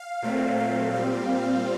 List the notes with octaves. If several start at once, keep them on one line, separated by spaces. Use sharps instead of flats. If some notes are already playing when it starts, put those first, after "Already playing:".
Already playing: F5
A#2 F#3 A3 C4
F5
A#2 G3 C4